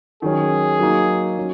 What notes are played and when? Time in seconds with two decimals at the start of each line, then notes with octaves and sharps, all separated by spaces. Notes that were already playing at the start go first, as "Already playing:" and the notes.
0.22 D#3 F#3 C#4 G#4
0.80 F#3 A#3 D#4
1.38 F#3 C#4